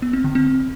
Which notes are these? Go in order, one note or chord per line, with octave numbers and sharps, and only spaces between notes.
B3
C4
D3
C4